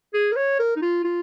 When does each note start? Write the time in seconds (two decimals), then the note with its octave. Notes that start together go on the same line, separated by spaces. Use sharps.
0.14 G#4
0.32 A#4
0.36 C#5
0.59 A#4
0.76 D#4
0.82 F4
1.04 F4